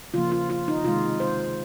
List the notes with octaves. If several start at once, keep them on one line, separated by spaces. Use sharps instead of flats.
C#3 F3 A#3 F4
F4
F4
D#4
C3 D#3 G#3 F4
C5